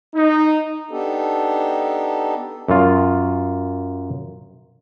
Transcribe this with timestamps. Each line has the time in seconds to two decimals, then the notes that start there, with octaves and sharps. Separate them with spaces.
0.15 D#4
0.91 B3 D4 D#4 G4 A4
2.68 F#2 F4